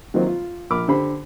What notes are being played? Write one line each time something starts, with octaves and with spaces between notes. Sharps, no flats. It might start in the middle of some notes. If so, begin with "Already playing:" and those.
D#3 F#3 A#3 C4 F4 C5
F4
A#1 A#3 B5 D6 F6
D3 G4 C5 B5